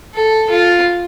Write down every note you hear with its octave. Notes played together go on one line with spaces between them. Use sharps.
A4
F4